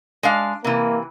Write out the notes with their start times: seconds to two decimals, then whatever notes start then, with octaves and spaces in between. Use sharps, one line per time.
0.23 G#3 D4 F5
0.64 C3 E3 A#3